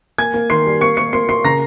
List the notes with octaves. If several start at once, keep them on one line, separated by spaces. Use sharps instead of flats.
A#3 G#5 G#6
A#3
D#3 C6 C7
G3
A#3 C#6 C#7
A#3 C#6 C#7
A#3 C6 C7
A#3 C6 C7
C#3 A#5 A#6